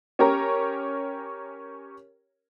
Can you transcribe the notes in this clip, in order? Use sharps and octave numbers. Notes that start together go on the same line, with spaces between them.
C#4 G4 A#4 C#5 A#5